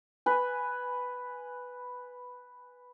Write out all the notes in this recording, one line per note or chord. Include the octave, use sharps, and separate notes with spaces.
B4 G#5